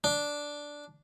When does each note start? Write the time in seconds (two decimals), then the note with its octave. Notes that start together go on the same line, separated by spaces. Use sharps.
0.04 D4